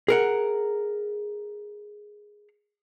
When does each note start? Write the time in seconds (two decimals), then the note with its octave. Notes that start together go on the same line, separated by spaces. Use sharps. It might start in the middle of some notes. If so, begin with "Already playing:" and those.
0.08 G#4 A#4 F#5